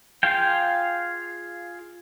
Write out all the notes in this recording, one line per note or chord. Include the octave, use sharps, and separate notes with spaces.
F4 G#4 F5 G5